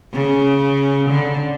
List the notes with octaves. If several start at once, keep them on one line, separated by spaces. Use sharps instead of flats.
C#3
D3